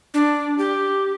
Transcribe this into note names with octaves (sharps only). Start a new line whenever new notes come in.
D4
G4